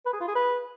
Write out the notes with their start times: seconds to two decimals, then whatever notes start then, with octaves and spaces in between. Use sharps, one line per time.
0.06 B4
0.13 G#4
0.21 F4
0.28 G#4
0.35 B4